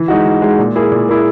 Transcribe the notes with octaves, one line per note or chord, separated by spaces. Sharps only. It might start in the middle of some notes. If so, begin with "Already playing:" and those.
Already playing: E3
G#3 D#4 F#4
E3
G#3 D#4 F#4
A#2
A#3 E4 G#4
A#2
A#3 E4 G#4